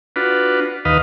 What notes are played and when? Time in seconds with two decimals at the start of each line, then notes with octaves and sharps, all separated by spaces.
0.16 D4 F4 F#4 B4
0.85 D#2 B4 D#5 F5